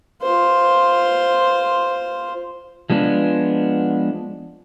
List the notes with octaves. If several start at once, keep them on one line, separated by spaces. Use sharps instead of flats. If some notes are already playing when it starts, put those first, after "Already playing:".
F4 C5
F3 G#3 B3 D4